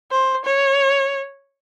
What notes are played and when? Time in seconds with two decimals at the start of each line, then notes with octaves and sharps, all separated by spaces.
0.11 C5
0.45 C#5